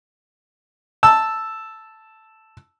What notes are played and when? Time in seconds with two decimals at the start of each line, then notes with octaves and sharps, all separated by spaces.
1.03 A5 E6